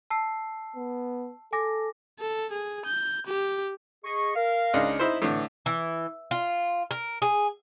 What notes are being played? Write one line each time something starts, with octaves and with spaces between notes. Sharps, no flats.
A5 E6 C7
B3
A4 G#5 D6 A#6
A4
G#4
G6
G4
G#4 D#5 C#6
A#4 F5
C#2 D4 D#4
D#4 E4 C5
A2 D3 E3
E3
F4
A#4
G#4